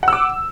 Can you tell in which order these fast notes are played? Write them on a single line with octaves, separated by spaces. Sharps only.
F#5 E6 D6